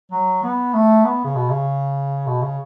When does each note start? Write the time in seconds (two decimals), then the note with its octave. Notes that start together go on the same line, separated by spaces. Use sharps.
0.12 F#3
0.44 B3
0.74 A3
1.05 B3
1.24 C#3
1.36 B2
1.50 C#3
2.27 B2
2.42 C#3